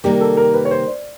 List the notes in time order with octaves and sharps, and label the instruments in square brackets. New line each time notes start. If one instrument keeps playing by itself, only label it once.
[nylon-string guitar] C3 D#3 G3 A#3 [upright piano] G4
[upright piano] A4
A#4
B4
C#5
C5
D5